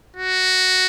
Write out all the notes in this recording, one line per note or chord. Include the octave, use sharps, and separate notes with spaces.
F#4